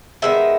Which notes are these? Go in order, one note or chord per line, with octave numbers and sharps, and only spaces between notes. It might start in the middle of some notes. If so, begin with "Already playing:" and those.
D#3 G#3 B3 E5